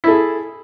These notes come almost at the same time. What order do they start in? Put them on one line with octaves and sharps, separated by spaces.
E4 A4 G#4